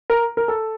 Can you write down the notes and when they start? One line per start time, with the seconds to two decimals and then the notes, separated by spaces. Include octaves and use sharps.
0.10 A#4
0.37 A#4
0.48 A4